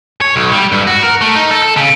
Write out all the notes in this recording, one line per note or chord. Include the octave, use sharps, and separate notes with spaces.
C#5
B1
G3
G2
F#4
A#4
A3
D#4
A4
A4
C#3